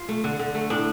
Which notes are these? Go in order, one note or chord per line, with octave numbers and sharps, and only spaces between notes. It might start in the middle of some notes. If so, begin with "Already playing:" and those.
Already playing: F4
A3
D3
D3
A3
A2 D4